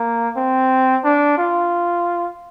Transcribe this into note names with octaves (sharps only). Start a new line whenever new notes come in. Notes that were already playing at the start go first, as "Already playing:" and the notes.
Already playing: A#3
C4
D4
F4